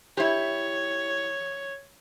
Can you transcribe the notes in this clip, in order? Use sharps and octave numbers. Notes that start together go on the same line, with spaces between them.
E4 G4 C#5